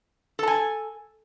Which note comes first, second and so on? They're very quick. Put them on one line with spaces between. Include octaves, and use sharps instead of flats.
A4 A5 G#5